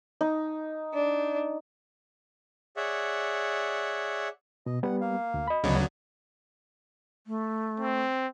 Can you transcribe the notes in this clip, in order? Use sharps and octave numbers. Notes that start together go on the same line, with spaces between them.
D#4
D4
G#4 C#5 D5 E5 F#5
B2 D#5
G3 B3 F#5
A#3 F5
D2
D#5 B5
D2 C#3 F#3 B3 C#5 D5
A3
C4